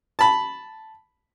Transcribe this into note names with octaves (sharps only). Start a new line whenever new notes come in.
A5 B5